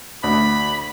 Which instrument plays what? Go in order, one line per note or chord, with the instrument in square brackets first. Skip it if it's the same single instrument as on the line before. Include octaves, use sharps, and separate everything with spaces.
[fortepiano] D2 [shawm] B5